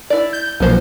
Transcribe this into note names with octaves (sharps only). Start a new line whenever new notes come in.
E4 D5
G6
B1 A#2 F3 B3 C5